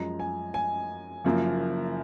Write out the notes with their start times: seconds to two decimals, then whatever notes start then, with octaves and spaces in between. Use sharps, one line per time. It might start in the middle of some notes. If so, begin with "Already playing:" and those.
Already playing: F#2 F3 G#3 A#5
0.19 G#5
0.54 G#5
1.24 F#1 F#2 F3 A#3